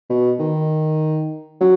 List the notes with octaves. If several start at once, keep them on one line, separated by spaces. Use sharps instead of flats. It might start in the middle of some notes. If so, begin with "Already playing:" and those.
B2
D#3
F#3